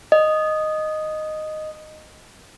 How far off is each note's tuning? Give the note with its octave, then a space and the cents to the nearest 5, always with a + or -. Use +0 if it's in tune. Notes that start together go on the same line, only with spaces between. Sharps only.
D#5 -5